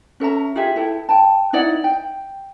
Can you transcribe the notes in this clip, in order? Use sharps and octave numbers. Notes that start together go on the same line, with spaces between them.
C#4 A4 E5 A#5
F4 G4 G#4 E5
E4 A4 G5
G5 A5
D#4 E4 D5 F#5
G5